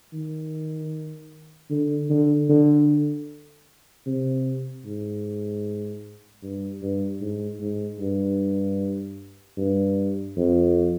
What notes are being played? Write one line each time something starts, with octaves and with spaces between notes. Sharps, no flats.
D#3
D3
D3
D3
C3
G#2
G2
G2
G#2
G#2
G2
G2
F2